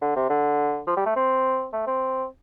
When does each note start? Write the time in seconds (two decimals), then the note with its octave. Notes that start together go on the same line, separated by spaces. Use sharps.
0.02 D3
0.16 C3
0.30 D3
0.87 F3
0.97 G3
1.06 A3
1.16 C4
1.73 A3
1.87 C4